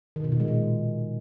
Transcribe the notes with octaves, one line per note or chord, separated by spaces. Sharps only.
D#3
B2
A#2
G#3
A#2